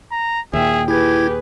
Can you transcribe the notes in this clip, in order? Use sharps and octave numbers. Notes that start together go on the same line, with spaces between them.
A#5
D#2 A#2 G#4 E5 G5
E4 G4 G#4 B4 G#6